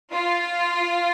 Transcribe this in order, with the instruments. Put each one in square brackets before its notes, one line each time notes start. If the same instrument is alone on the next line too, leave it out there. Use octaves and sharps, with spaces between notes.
[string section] F4